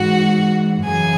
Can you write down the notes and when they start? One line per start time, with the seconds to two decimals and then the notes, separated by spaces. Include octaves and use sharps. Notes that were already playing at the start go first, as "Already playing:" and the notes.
Already playing: G#2 E3 F#4 F#5
0.84 F#2 C#3 E3 G#4 G#5